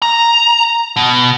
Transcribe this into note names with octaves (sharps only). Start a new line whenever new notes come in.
A#5
B2